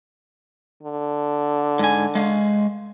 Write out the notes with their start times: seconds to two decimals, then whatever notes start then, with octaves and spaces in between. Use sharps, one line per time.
0.83 D3
1.79 G#2 G#5
2.15 G#3 F5